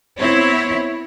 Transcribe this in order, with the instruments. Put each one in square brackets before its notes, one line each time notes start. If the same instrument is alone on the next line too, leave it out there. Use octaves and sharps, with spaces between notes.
[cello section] B3 C4 E4 C#5